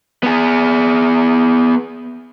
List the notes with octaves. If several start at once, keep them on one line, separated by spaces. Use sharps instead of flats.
B3 G#4